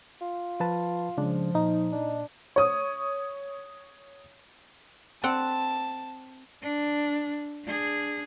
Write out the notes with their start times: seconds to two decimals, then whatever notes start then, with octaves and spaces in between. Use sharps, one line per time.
0.21 F4
0.60 F3 B4 A5
1.17 C#3 F3 G#3 D4
1.55 A#2 D#4
1.92 D4
2.56 C#5 D#6
5.24 C4 F#5 A5
6.62 D4
7.65 D4 G#4